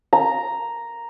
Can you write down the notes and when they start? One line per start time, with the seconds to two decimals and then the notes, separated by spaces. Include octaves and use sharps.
0.13 A#5